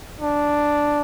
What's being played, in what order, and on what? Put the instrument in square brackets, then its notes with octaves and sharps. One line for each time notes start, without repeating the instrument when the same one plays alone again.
[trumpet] D4